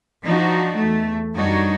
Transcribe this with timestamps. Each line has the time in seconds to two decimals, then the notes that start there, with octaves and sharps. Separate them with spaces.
0.25 F3 D4 D#4 F#4
0.77 E2 A3
1.35 F#2 G3 D4 D#4 F#4 C#5